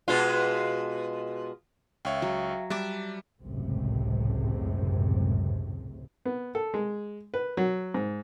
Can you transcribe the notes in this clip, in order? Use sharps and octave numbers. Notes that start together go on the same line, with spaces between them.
B2 G#3 F4
C#2 C#5 E5 F5 G5
F#3
G3 E5 A5 D6 F#6
G#1 C#2 F#2 A2 C3
B3
A4
G#3
B4
F#3
G#2